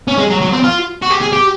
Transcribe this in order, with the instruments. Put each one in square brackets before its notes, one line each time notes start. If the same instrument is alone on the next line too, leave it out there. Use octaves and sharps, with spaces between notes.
[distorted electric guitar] C#4
G#3
F#3
F#3
C4
F4
F#4
G4
G#4
G4